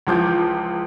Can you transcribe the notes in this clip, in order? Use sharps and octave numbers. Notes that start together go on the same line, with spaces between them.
C#2 E3 F3 D6 G6 G#6